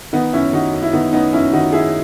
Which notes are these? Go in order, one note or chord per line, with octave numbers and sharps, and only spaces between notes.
D#3 B3 D#4
F#2 C#4 E4
D#3 D#4 F#4
F#2
E4
D#3 B3 D#4
F#2 B3 D#4
F#2 C#4 E4
D#3 D#4 F#4
D#3 E4 G#4